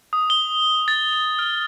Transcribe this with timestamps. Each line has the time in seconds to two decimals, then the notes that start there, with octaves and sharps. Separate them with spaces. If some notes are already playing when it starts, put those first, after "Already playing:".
0.13 D#6
0.30 G7
0.88 A6
1.13 G7
1.39 F6